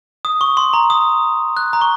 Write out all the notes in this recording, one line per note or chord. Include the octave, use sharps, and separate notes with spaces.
D#6
C#6
C6
A#5
D#6
F#6
A#5
C#6